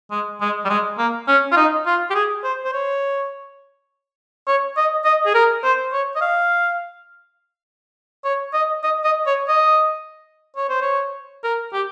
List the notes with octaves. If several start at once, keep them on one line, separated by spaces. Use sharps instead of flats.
G#3
G#3
G3
G#3
A#3
C#4
F4
D#4
F4
G4
G#4
C5
C5
C#5
C#5
D#5
D#5
G#4
A#4
C5
C#5
D#5
F5
C#5
D#5
D#5
D#5
C#5
D#5
C#5
C5
C#5
A#4
G4